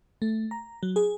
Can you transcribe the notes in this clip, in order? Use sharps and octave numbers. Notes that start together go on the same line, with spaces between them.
A3
A#5
F#3
G#4